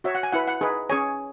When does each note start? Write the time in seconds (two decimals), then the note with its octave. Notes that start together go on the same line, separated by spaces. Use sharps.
0.04 F#4 C#5 E5
0.15 F#5
0.23 G#5
0.33 E4 B4 F#5
0.47 F#5
0.61 D#4 G#4 B4
0.90 C#4 G#4 C#5 G#5